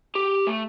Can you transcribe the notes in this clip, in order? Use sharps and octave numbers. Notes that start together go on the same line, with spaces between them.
G4
A3